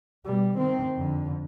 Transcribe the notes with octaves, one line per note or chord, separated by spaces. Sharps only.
B2 G3
D#3 C4
F2 D3